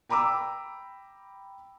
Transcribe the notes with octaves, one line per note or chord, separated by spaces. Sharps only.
G5 A#5 B5 D6 E6